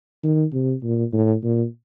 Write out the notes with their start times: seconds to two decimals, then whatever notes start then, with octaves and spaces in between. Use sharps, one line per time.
0.23 D#3
0.53 C3
0.83 A#2
1.13 A2
1.43 A#2